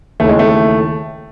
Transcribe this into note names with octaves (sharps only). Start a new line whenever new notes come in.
D#2 C#3 E3 A3
G#3
A3